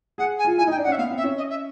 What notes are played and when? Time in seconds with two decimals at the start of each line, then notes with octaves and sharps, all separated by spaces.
0.18 G#4 F#5
0.39 G#5
0.45 F4
0.58 E4 G#5
0.67 D#4 G5
0.78 D4
0.84 F#5
0.87 C#4
0.92 E5
0.97 B3 F5
1.11 C4
1.17 E5
1.24 C#4
1.37 D#5
1.50 E5